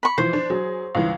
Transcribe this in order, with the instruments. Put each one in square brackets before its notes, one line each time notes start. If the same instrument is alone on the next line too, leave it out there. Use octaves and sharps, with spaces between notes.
[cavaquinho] B5 C#6
[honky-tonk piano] E3 F3 [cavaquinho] C5
[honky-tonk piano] D4
F#3 G#4
C#2 G2 E3